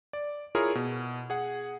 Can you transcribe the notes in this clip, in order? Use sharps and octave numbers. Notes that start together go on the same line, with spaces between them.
D5
E4 F4 G#4 A#4 C#5
B2
G#4 F#5